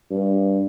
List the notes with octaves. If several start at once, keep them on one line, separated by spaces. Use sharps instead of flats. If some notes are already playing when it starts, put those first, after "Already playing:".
G2